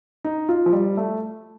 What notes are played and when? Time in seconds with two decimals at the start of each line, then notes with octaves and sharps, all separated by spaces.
0.24 D#4
0.49 F4
0.66 F3
0.73 G3
0.97 A3